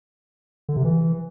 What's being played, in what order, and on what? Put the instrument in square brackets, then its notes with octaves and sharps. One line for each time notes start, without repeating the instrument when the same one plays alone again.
[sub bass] D3
C3
E3